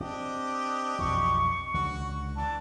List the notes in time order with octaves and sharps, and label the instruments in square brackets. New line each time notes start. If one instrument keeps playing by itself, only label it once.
[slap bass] C4 [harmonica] D4 G4 D#5
[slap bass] B1 F2 E3 [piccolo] C#6
[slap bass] C#2 D3 [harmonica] F#4
[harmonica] E3 D4 [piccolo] A5